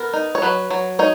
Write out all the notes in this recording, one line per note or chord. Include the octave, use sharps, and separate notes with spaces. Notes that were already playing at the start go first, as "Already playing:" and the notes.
Already playing: B3 A#4
D#4
C#5
F#3 B4
F#3
D#4 C#5